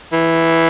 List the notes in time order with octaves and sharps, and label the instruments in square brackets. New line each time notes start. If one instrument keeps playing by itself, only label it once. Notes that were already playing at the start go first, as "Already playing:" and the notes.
[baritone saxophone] E3